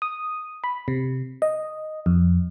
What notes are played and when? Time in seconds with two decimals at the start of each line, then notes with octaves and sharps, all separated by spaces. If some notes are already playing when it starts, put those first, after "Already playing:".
0.02 D#6
0.64 B5
0.88 C3
1.42 D#5
2.06 F2